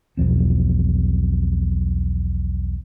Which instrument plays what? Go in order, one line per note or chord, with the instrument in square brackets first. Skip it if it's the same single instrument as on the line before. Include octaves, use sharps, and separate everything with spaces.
[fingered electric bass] B1 E2 F3 C4